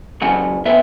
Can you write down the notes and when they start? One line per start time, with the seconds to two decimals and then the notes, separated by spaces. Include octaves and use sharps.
0.21 C#2 C#3 F#3 C#4 F#5
0.66 A#2 B3 E5